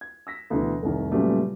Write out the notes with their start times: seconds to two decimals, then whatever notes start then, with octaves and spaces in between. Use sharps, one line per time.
0.01 G#6
0.27 E6 A#6 B6
0.50 D2 B2 D3 E3
0.83 F1 C2 D#3
1.11 A#2 C#3 F#3 G3 A3 B3